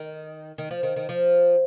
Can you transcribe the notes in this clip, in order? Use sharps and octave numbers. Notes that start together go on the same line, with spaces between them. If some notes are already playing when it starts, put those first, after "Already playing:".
Already playing: D#3
D#3
F3
D#3
D#3
F3